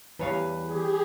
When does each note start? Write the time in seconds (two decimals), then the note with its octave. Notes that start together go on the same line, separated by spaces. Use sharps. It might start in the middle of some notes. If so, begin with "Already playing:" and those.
0.19 E2 E3 G3 B4 C#5 F5
0.62 G4 G#4